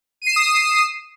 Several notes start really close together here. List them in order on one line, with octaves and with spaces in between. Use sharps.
D#7 C7 E7 D#6